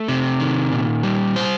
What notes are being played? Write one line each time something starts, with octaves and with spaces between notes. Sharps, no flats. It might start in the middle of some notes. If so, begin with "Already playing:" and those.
Already playing: A3
C3
D#3
A#2
G3
C5